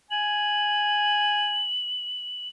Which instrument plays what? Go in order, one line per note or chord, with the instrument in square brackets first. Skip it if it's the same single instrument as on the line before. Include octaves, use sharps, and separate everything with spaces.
[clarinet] G#5 [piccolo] F#7